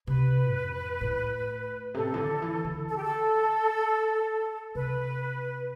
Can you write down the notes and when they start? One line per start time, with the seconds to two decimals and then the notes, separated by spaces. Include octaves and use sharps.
0.07 C3 B4
0.54 F2
1.01 A2
1.94 C3 A4
2.14 E3
2.18 D3
2.42 E3
2.65 D3
2.88 A4
2.95 G4
3.02 A4
4.75 C3 B4